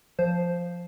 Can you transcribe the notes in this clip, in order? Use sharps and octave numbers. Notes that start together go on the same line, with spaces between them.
F3 C5